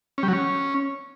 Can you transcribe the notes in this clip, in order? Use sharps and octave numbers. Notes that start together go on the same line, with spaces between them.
C#4
G3
F#3
C#4